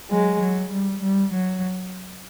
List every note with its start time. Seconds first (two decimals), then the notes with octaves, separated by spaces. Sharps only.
0.10 F#3 G#3
0.41 F#3
0.72 G3
1.02 G3
1.34 F#3